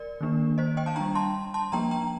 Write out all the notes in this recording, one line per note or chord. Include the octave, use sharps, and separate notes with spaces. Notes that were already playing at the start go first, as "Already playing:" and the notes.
Already playing: A#4 D5
D#3 A#3 D4
C5 D#5
D#5 G5
F5 A5
G3 D4 G5 A#5
A5 C6
A5 C6
F3 A#3 D4 G5 A#5
G5 A#5